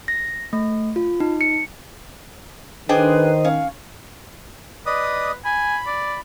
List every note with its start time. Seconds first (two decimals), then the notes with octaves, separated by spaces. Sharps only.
0.08 A#6
0.53 A3
0.96 F4
1.20 D#4
1.41 C#7
2.89 D#3 D4 G#4 B4 C5 D#5 G5
3.44 C#4 F5
4.86 B4 D5 D#5 D#6
5.45 G#5 B5
5.87 D5